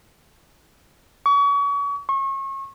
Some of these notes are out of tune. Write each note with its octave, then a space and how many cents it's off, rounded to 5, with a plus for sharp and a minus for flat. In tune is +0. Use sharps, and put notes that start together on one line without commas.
C#6 +35
C#6 -35